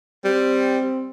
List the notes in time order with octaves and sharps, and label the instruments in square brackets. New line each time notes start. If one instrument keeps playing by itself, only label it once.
[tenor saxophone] G3 [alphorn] C4